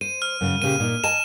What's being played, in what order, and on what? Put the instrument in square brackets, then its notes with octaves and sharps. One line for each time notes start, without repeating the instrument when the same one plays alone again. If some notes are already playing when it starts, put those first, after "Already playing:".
[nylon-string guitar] C5 [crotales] D#7
[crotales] F6
[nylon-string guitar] F#2 C#3
[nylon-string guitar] A#2 C#3 G4 [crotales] D#7
[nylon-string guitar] A#2 D#4
[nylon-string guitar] D#5 G#5 A5 [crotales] E7